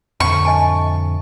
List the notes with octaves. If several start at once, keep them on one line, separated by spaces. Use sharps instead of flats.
F2 A2 D3 C#6
D#5 G#5 A5